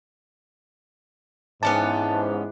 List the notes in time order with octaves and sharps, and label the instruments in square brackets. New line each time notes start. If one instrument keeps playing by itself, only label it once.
[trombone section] G#2 [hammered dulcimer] E3 D4 [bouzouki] B3 C#4 G4 [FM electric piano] A5